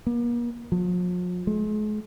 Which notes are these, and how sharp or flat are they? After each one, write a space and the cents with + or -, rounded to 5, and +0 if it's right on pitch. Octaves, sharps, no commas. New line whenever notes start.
A#3 +40
F3 +45
G#3 +40